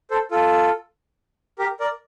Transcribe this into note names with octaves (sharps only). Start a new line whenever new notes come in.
A4 C5
F4 A4
G4 A#4
A#4 D5